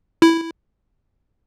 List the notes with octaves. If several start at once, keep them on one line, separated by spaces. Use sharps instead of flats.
E4